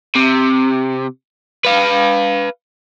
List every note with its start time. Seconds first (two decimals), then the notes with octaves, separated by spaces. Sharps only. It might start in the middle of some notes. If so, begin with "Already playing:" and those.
0.16 C3
1.65 B4 F5